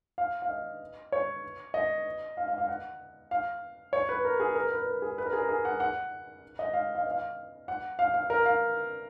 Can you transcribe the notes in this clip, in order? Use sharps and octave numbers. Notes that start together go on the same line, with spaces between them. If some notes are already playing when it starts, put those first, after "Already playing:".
F5
F5
D#5
C#5
D#5
F5
F5
F5
F#5
F5
C#5
B4
A#4
G#4
A#4
B4
A#4
G#4
B4
A#4
G#4
A#4
G#4
F#5
F#5
D#5
F5
F5
D#5
F5
F#5
F5
F5
A#4
F5